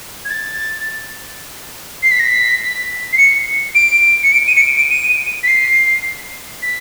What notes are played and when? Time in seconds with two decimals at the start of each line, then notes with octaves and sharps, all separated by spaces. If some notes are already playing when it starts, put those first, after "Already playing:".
0.25 G#6
0.30 A6
2.03 C7
2.11 B6
2.20 A#6
2.28 B6
3.13 C7
3.18 C#7
3.75 D7
4.23 C#7
4.33 D7
4.47 D#7
4.56 C#7
4.62 D7
4.76 D7
4.90 D#7
5.43 B6
5.47 C7
6.62 B6